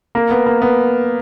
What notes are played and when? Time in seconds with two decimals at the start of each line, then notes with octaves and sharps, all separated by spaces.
0.15 A#3
0.31 B3
0.46 A#3
0.62 B3